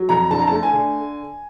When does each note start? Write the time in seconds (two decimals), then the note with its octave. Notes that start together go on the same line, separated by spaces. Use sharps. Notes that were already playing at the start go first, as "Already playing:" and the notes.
Already playing: F#3
0.09 F2 A#5
0.31 D3 A5
0.39 A#5
0.47 A3 A5
0.63 G#5
0.73 D3